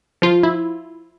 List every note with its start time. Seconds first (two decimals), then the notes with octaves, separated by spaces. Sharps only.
0.22 F3 F4
0.43 E4